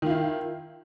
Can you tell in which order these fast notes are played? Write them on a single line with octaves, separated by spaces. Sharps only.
D#3 F4 E4